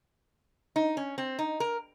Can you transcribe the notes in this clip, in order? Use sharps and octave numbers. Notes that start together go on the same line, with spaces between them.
D#4
C#4
C4
D#4
A#4